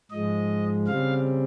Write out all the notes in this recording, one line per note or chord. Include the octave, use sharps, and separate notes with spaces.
G#2 F3 G#3 D#5
C#3 G3 C4 F5